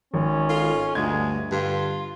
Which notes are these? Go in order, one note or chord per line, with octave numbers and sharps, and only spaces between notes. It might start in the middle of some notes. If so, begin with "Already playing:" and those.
G#1 C#4
F4 A4
D2 G2 G#3 G#6
G2 D3 F4